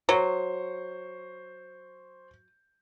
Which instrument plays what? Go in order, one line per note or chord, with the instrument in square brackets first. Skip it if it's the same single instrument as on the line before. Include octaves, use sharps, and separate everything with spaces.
[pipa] F#3 [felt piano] C5 C#6